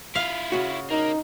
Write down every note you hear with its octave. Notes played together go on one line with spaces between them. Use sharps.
E4 F4 F5
C#3 F#4
A#3 D#4